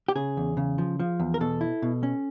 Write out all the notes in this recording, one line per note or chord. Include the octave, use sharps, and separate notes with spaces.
G4
C#3 G#4
E2
C#3
F3
F3
E2
A#4
B2 A4
E4
B2
C#4